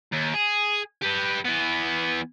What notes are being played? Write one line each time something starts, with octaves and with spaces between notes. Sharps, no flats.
D#2
G#4
G4 B4
E3 B3